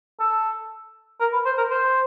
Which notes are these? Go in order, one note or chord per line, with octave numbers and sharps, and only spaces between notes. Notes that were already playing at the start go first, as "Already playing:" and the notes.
A4
A#4
B4
C5
A#4
C5